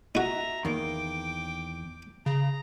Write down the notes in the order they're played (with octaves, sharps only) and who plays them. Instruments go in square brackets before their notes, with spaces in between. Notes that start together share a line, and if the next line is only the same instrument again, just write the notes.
[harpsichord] D#4 F#4 [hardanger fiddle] E5 A#5
[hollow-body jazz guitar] E2 D#3 A#3 [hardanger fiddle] G5 D6
[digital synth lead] C#3 [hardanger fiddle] A#5